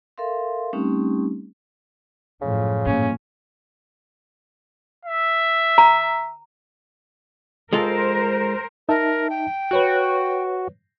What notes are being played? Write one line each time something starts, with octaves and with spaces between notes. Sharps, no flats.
A4 A#4 E5 F5 C6
G3 A3 C4 C#4 D#4 G4
F#2 A2 C#3 F3
G2 A#2 C#4
E5
A#5
G#3 F4 A4 A#4 C5
D#4 A#4 E5 A5
G5
F#4 B4 C#5 F#6